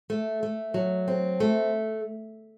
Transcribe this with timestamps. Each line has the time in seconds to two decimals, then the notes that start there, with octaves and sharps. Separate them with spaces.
0.10 A3
0.43 A3
0.74 F#3
1.08 C4
1.40 A3